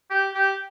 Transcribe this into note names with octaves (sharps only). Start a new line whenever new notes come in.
G4
G4